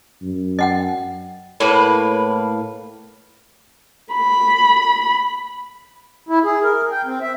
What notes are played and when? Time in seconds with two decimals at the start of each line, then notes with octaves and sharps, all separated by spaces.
0.22 F#2
0.59 D#5 F#5 G5
1.60 A2 A#3 B4
4.13 B5
6.29 E4
6.45 G#4
6.63 A#4
6.92 G5
7.05 C4
7.22 E5